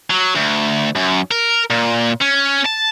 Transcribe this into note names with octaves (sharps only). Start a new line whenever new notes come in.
F#3
D2
F#2
A#4
A#2
C#4
A5